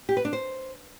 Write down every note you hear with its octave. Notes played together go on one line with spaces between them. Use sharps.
G4
B4
D4
C5